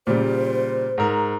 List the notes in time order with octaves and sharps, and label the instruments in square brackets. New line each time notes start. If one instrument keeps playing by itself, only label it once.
[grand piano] A#2 C#3 G3 [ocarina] C5
[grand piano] G#2 A#4